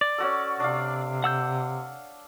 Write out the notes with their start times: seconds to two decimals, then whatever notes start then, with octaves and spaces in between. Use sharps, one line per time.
0.01 D5
0.18 C#4 F#4 A4
0.60 C3 D4 F5
1.24 F#5 E6 G6